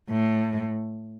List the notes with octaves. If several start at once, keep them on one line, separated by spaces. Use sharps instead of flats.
A2